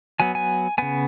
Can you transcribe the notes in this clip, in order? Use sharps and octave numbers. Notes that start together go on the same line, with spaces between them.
F#3 B3 G#5
G#5
C#3 B3 G#5